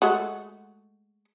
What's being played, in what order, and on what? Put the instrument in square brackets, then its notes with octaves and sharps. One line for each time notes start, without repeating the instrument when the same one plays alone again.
[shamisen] G#3 A3 F#4